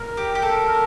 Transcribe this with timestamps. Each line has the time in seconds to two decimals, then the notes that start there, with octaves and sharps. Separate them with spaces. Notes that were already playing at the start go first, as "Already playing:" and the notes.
Already playing: A#4
0.17 G4
0.35 G4
0.42 A4
0.68 A#4